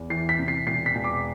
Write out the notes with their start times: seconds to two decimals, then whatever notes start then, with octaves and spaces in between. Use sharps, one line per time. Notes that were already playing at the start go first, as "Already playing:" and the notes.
Already playing: E2
0.10 E3 C7
0.29 B6
0.39 C3
0.48 C7
0.67 E1 C7
0.86 B6
0.95 E1
1.04 D6